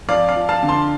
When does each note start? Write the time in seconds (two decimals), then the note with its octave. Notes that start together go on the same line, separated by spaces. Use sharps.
0.09 F2 D5 F5
0.29 D5 F5
0.36 F3
0.49 F5 A5
0.63 D3
0.68 A5 C6